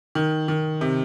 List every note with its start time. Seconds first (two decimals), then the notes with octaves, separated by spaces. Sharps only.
0.15 D#3
0.48 D#3
0.81 C3